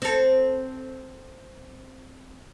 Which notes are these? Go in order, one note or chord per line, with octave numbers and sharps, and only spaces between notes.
C4 A4